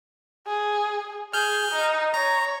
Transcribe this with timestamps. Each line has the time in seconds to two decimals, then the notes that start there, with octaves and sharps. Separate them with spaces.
0.47 G#4
1.33 G#4 F6 G6
1.72 D#4
2.14 C#5 A#5